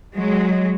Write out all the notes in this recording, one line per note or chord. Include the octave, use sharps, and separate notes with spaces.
F#3 G#3